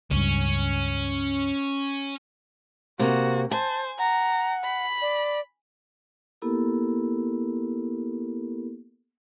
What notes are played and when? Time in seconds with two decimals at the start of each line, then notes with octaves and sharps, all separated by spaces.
0.11 C#2 G2 C#4
2.99 C3 A#3 F#4
3.51 C5 G#5 A5
3.99 F#5 A#5
4.64 B5
5.02 D5
6.42 A#3 B3 E4 G4 A4 A#4